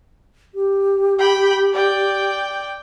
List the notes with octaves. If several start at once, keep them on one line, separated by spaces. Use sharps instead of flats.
G4
G5 B5
D5 G5